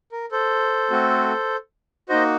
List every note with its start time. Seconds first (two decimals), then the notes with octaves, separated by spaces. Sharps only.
0.12 A#4
0.31 A4 C5
0.91 A3 C4 F#4
2.09 A#3 D#4 F#4 C5 D#5